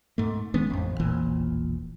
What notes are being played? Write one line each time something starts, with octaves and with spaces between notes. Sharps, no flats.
G#2 A3
D#3 G#3 B3 C#4
A1 F2
E1 A#1 A#2 E3